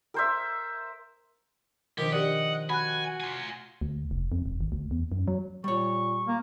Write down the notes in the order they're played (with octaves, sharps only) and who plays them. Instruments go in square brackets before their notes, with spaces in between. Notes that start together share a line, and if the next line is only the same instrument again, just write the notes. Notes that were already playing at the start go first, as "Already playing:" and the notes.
[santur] A#4 C5 E5
[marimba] B2 D4 [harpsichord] D#3 F3 [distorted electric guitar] G4
[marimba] G4 A#4 D5 [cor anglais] D#5 [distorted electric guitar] F#5
[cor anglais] F#4 [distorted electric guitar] G#5 [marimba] B5 F#6
[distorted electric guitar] F4 G#5
[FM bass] D2
F1
F2
E1
G#1
D2
E2
F#2
F#3
[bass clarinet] A#2 [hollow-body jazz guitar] G3 C#5 [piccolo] C#6
[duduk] A#3